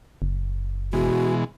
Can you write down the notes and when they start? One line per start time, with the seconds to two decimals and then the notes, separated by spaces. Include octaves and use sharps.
0.22 F#1
0.93 B2 E3 G#3 F#4